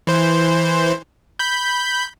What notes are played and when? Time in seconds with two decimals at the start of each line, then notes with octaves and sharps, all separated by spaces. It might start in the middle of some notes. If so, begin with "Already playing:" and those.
0.07 E3 C5
1.39 B5 G6